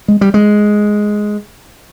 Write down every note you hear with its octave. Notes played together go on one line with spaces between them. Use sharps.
G#3
G3
G#3